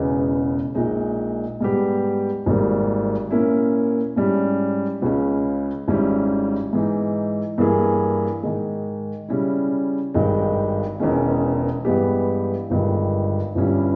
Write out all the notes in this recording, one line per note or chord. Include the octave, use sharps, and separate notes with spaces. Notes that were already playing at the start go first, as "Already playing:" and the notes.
Already playing: E1 E2 C#3 G#3 B3
A#1 A#2 G#3 D#4
G#2 G3 B3 G4
G#1 G#2 G3 A#3
A#2 A#3 C#4 E4
G#2 G3 C#4 E4
C#2 C#3 G#3 C#4
G#1 G#2 G3 C#4 E4
G#2 E3 G#3 D#4
G2 E3 A#3 E4 G#4
G#2 D#3 G#3
C#3 G3 C#4 E4
G#1 G2 D#3 G#3 D#4
E1 E2 D#3 G#3 C#4
G2 E3 G#3 B3 G4
G1 G2 D#3 G#3
G1 G2 G3 C#4 E4